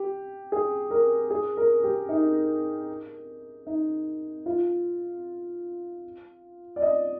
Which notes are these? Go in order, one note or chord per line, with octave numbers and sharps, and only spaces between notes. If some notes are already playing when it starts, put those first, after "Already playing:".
Already playing: G4
G#4
A#4
G#4
A#4
G4
D#4
D#4
F4
D5
D#5